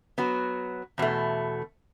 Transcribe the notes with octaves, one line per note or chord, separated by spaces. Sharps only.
F#3 B3 F#4
E2 B2 A3